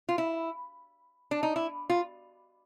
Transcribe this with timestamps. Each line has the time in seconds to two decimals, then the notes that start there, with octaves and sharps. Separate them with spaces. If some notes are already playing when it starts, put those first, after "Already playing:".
0.09 F4
0.18 E4
1.31 D4
1.43 D#4
1.56 E4
1.90 F4